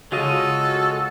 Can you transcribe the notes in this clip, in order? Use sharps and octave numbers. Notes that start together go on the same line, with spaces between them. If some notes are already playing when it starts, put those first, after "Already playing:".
C#3 G#3 F4 F#4 A4 D#5